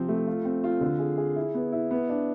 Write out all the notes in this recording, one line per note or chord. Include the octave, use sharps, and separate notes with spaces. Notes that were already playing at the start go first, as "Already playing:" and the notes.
Already playing: C3 F3 C4
A3
F4
C4
F4
D3
G#4
G#4
E4
B3
E4
B3
D4